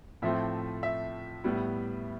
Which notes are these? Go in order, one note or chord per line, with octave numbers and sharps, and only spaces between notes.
A2 F3 A3 C4 E5
E5
A2 G3 B3